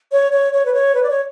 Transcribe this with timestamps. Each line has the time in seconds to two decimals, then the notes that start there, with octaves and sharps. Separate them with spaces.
0.12 C#5
0.32 C#5
0.53 C#5
0.66 B4
0.74 C#5
0.95 B4
1.03 D5
1.10 C#5